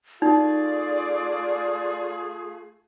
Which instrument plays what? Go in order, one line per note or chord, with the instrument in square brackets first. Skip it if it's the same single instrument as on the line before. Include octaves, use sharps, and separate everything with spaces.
[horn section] A3 F4 G#4 [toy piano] D#4 [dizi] D5